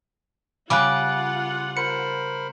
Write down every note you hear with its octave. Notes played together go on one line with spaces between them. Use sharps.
C#3 G3 F4 F#5 D6 F#6
A#4 C5 B5 C#7